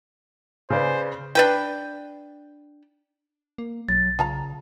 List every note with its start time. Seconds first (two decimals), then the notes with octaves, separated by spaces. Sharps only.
0.70 C#3 B4 C5 D5 G#5
1.35 D4 B4 G5
3.58 A#3
3.89 B1 F#3 A6
4.19 C#3 F4 A5 A#5